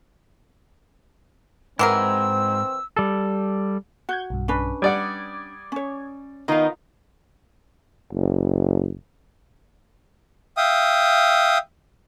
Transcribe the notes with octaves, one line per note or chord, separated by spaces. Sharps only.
G#2 E3 F#3 C4 A#4 E6
G3 A4
F#4 F#5 G6 G#6
B1 G2
C#4 D4 B4
G3 D5 F#5 D6 D#6 G#6
C#4 C#5
D#3 B3 D#4 F4 F5 A#5
F#1
E5 F5 G5 D#6